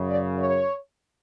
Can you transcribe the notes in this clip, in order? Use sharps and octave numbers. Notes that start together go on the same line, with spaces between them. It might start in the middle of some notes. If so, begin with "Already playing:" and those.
Already playing: F#2 C#3
D5
C#5